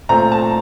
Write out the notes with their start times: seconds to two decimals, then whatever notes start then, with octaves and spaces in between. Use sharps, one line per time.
0.09 A#2 A3 C4 A#5
0.32 A5